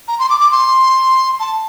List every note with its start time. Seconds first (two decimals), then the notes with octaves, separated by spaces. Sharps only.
0.08 A#5
0.19 C6
0.30 D6
0.40 D6
0.51 C6
1.40 A5